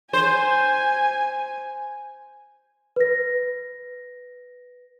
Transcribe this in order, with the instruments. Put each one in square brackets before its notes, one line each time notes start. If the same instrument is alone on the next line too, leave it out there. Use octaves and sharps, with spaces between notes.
[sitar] C5 [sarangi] G#5
[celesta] B4 A#6